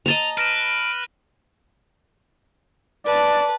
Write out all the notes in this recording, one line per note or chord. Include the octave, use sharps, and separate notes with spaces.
D#5 A5 A#5 F7
B4 F6 A#6 D7 E7
B4 D5 A5